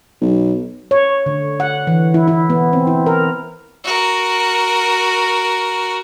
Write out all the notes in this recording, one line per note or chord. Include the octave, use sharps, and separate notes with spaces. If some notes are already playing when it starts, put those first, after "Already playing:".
B1
C#5
D3
F#5
E3
E4
E4
B3
C4
E4
A#4
F#4 A#4